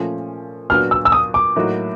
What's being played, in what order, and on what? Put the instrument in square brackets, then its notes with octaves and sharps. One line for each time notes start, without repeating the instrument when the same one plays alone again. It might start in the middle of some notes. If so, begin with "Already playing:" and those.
Already playing: [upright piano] A#2 F3 A3 C#4
[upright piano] A#2 F#3 B3 D4 F#4 [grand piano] F6
[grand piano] E6
E6
D#6
D6
[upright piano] A2 F#3 A#3 D#4 F#4